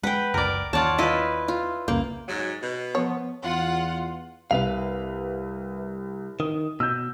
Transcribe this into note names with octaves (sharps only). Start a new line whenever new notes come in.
G#3 B4 F#5 G5
F#1 C#2 A#4 D5
D#2 F4 C#5 D5 F#5 A5
E4 F4 B4 D#5
F4
F1 C2 C#3 A#3
G#2 F#3
B2
F3 B3 C#5
E2 F4 F#5
C2 B4 E5 F5 F7
D#3 D#6
B2 E6 G6